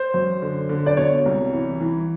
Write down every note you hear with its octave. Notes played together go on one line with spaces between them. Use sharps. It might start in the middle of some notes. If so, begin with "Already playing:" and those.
Already playing: C5
F#2
D3
D3
D5
B2 C#5
C2
E3
E3